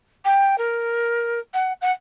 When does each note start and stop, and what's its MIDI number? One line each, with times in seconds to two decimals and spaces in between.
0.25 0.58 79
0.58 1.39 70
1.54 1.73 78
1.81 1.92 78